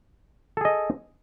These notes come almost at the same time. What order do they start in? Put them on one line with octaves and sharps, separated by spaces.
A4 G#4 D#5